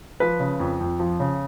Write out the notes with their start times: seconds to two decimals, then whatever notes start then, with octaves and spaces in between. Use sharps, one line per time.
0.20 F3 B4
0.40 C#3
0.60 F2
0.80 F2
1.00 F3
1.20 C#3